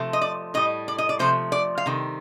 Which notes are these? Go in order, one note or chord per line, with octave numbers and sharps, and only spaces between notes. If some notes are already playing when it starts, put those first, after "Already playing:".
Already playing: C3 F3 A3
D#5
D5
A2 G3 D#5
D5
D#5
D5
C3 F3 A3 C5
D5
F5
C3 D#3 G3